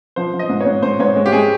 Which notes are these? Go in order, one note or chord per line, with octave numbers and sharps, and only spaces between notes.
F3 C5
F3
D#5
G#2
C#5
G#2
G#2 C5
G#2 C#5
G#3
G4
G#3 G#4